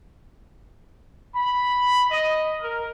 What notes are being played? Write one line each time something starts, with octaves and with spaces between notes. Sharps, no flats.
B5
D#5
A#4